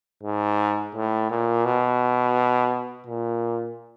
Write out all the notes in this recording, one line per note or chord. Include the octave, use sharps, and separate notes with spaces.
G#2
A2
A#2
B2
A#2